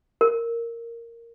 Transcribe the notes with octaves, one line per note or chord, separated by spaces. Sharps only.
A#4